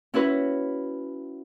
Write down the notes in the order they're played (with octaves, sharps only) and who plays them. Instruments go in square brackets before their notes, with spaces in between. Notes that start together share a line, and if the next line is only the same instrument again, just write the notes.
[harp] C#4 E4 F#4 B4